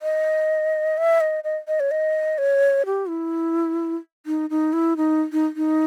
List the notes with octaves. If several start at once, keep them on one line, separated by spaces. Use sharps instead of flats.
D#5
E5
D#5
D#5
D#5
C#5
D#5
C#5
G4
E4
D#4
D#4
E4
D#4
D#4
D#4